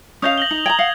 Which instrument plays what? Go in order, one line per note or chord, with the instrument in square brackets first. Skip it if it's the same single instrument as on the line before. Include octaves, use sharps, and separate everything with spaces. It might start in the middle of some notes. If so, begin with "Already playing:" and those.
[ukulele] C#4 D#5 F5 [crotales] D#6 G6 F7
[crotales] A#6 F#7 G7
[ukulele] D#4
[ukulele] G5 A#5 [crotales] G#6
[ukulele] F5 F#5